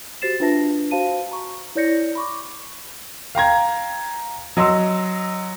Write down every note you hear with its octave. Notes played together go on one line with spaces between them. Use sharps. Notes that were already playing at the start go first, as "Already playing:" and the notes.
F#4 G4 C5 A6 C7 E7
D4 F4 B4 E5 A5 A#6
F#4 C5 F5 A5 D#7
A#5 C#6
E4 C#5 D5 G6 A#6 C#7
B5 C#6 D6
F5 G5 A#5 G#6
F#3 D#5 C6 E6